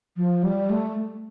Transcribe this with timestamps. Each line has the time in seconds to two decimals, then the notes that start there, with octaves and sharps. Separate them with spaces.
0.17 F3
0.43 G3
0.70 A3